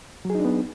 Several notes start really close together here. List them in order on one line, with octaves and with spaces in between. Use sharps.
F#3 G#4 D#4 D4 B3